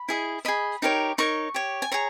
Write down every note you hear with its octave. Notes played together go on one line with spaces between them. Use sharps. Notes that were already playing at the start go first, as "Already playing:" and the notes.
Already playing: B5
E4 G#4 D#5
G#4 D#5 B5
D#4 G4 A#4 C#5
D#4 A#4 C#5 C#6
G4 C#5
G#5
G#4 C#5 A#5